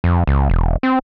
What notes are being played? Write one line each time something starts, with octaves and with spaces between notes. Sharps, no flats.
F2
C#2
E1
C4